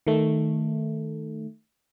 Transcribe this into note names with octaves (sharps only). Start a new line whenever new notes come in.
D#3 A3